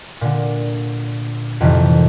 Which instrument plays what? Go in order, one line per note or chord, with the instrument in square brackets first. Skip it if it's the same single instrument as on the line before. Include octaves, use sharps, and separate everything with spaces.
[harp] A#2 D3
F2 A2 C3 D#3 E3 G3